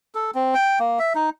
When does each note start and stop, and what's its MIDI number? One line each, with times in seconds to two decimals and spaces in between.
0.15 0.31 69
0.35 0.54 60
0.55 0.79 79
0.80 0.99 58
0.99 1.13 76
1.15 1.30 63